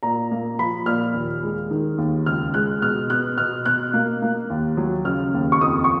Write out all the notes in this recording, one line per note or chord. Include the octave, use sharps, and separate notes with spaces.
A#2 A#5
A#3
F3 B5
A#2 F6
D#2
G#3
D#3
D#2
C#2 F6
G#3 F#6
B2 F6
B3 F#6
B2 F6
B2 F#6
A#3
A#3
D#2
F#3
C#3 F6
D#2
C#6
F2 D#6
C#6